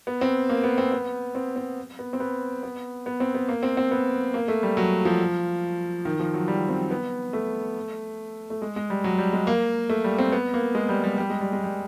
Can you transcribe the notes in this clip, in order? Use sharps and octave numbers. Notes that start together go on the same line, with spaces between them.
B3
C4
A#3
B3
C4
B3
C4
C4
B3
C4
B3
B3
B3
C4
B3
A#3
C4
C4
B3
A#3
A3
G3
F#3
F3
D#3
F3
F#3
G3
C4
B3
A3
A3
G#3
G#3
G3
F#3
G3
G#3
A#3
A3
G3
C4
B3
A#3
G#3
G3
G3
G3
G#3
G3
G#3
G3